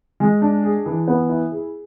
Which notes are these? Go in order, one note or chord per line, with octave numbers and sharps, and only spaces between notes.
G#3
D4
G#4
E3
B3
E4
G#4